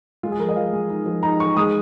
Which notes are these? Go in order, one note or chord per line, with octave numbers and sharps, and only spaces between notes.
G#3 F4
G#4
F3 A#4
D#5
F3 F5
G#3
D#4
F3
D#4 A#5
D#4 C#6
G#3 D#6